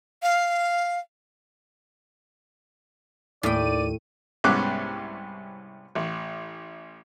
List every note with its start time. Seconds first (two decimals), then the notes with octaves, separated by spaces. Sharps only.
0.23 F5
3.43 D#2 A2 D5 G5 D#7
4.44 C2 G#2 B3 C#4 D6 F#6
5.95 A1